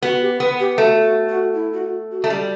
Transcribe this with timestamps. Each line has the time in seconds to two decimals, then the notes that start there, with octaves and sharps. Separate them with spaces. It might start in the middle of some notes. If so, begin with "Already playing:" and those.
0.02 B3 F#4
0.21 G4
0.40 B3 B4
0.59 G4
0.78 A3 F#4
1.03 F#4
1.29 F#4
1.54 E4
1.73 F#4
2.11 F#4
2.24 A3
2.30 G3 F#4